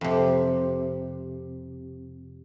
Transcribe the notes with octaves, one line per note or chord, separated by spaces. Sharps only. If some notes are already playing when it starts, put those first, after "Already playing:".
F2 C3